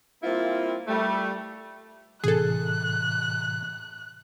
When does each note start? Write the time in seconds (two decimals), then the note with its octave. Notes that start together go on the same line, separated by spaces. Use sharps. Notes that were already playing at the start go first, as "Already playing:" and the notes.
0.23 G3 A#3 C4 E4 F4
0.88 G3 A3
2.24 A2 C3 E3 G#4 A4 F#6